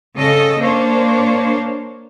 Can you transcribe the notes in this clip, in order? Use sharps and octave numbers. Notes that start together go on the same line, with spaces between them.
C#3 A4 D#5
A#3 D4 C5 C#5